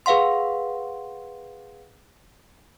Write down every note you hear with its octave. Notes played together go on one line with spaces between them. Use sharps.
G#4 B4 F5 F#5 C6